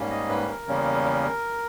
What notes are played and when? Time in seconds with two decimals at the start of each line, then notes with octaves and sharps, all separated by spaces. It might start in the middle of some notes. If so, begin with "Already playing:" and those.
Already playing: G#2 G3 A#3 C#4
0.10 D#5
0.29 B4
0.48 A#4
0.67 E2 C#3 G3 A#3 C#4